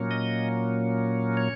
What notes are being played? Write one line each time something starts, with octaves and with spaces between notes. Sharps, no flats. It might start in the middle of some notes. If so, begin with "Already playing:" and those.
Already playing: A#2 F#3 A#3 C#4
D#5
C#5